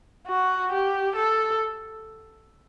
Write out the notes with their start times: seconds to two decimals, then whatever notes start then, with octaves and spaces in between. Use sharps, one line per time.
0.28 F#4
0.72 G4
1.15 A4